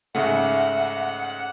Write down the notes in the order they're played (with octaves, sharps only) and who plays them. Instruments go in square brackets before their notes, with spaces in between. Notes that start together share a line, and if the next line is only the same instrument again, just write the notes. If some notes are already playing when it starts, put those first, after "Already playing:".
[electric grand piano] G#2 C#3 A3 [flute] E5 [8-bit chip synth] F#5